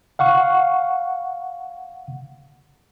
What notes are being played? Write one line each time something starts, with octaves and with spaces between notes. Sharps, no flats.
F5 F#5 C#6